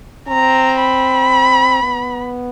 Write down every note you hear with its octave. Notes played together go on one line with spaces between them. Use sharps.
C4 A#5
B5
B3